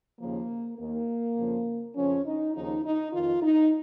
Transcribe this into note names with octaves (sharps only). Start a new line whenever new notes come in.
D#2 C#3 F3 A#3
D#2 D#3 A#3
F2 C#3 F3
F2 C#3 F3 C#4
D#4
D#2 C#3 F3 D#4
D#4
F2 D#3 F4
D#4